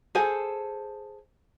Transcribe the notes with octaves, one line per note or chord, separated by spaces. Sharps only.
G#4 A4 C5 G#5